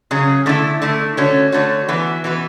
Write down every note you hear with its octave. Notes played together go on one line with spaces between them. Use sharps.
C#3 F#3 C#4 G#4
D3 A3 E4
D3 A3 E4
D3 A3 C#4 F#4 C#5
D3 A3 C#4 F#4 C#5
E3 B3 F#4 B4
E3 B3 F#4 B4